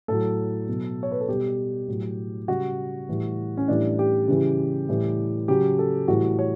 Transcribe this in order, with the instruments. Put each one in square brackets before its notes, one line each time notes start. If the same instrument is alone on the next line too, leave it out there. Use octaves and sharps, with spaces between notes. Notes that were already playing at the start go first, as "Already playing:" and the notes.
[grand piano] A2 F#3 A4
B2 F#3
C#5
B4
A4
B2 G3 G4
A2 F#3
C#3 G3 F#4
A2 E3 G3
C#4
A2 E3 G3 D4
G4
C#3 E3 G3
A2 E3 G3
C#3 F#3 G4
A4
A2 E3 G3 F#4
C#5